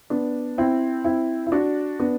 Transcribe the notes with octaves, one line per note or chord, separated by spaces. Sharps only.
B3 D4
C4 E4
C4 E4
E4
D4 F#4
B3 D4